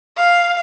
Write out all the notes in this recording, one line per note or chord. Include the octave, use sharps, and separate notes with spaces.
F5